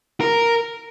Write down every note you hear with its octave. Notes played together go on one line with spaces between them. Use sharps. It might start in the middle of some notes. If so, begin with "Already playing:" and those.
A#4